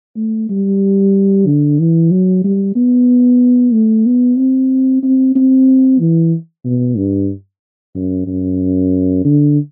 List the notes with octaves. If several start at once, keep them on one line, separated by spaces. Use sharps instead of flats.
A3
G3
D3
E3
F#3
G3
B3
A3
B3
C4
C4
C4
E3
B2
G2
F#2
F#2
D3